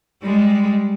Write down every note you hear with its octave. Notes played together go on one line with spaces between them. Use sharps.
G3 G#3